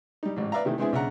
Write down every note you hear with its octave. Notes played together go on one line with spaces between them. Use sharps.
G3 D#4
A1 G#2
B4 D5 E5 F5 A#5
C3 D#3 E3 A3
G#3 B3 C4 D4 E4 G#4
B1 C#3 D4 E5 F#5 A#5